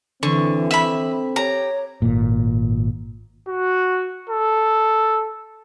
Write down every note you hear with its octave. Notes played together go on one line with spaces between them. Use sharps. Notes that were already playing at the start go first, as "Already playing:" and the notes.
D3 E3 C4 C#6
E5 B5
G4 C#5 A#5
G#1 A#2
F#4
A4